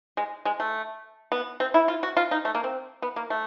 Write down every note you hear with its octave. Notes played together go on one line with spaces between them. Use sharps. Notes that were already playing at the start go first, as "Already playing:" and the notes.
G#3
G#3
A3
B3
C4
E4
F4
F#4
F4
D#4
A3
A#3
C4
B3
A#3
A3